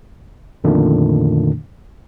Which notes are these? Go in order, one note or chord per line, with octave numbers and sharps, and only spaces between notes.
F2 A#2 D3 D#3 A3 D4